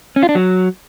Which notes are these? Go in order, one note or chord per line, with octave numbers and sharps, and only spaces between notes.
C#4
F4
D4
F#3